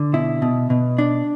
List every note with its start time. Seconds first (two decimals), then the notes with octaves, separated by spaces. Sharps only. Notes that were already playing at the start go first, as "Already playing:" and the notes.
Already playing: D3
0.13 B2 E4
0.42 B2
0.70 B2
0.98 D4